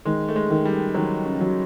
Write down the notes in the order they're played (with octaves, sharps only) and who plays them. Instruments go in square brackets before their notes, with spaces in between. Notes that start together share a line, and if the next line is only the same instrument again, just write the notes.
[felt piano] D#3 [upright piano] G#3
[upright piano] A3
G#3
[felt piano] D#3
[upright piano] G3
[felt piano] D#3 [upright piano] F#3
[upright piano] C#3
[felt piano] F#3